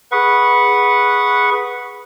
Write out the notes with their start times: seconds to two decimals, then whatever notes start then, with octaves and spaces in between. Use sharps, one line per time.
0.12 G#4 B4 F#5 C#6